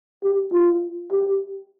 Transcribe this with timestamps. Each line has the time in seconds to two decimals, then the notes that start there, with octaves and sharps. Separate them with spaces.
0.24 G4
0.52 F4
1.12 G4